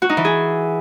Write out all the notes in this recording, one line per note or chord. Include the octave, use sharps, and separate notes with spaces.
F#4
D#4
E3
G#4